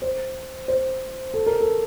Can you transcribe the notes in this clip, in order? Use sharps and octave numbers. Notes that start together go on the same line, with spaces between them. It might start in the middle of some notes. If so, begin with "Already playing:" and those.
C5
C5
A4
A#4
A4